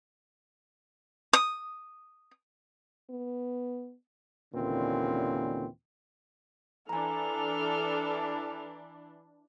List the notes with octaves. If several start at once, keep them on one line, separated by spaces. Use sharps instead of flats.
D#6
B3
D#2 A#2 D3 E3 C4 C#4
E3 D4 A4 G#5 A#5 F6